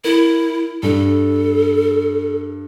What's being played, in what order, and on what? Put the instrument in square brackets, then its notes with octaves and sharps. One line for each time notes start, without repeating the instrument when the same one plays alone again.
[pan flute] E4 [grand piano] A#4
[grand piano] G2 [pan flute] A4